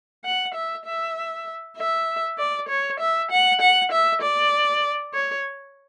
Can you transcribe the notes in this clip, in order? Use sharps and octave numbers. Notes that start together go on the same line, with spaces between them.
F#5
E5
E5
E5
D5
C#5
E5
F#5
F#5
E5
D5
C#5